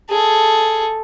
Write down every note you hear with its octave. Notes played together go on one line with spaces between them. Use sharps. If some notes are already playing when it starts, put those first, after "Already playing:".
G#4 A4